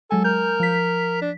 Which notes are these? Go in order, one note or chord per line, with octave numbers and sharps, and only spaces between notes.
F#3 G#3 A4 G#5
A#4 G6
F3 B6
D4